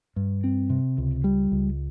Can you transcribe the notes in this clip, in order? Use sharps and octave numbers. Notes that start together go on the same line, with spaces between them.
G2
C4
C3
C#2
G3
C#2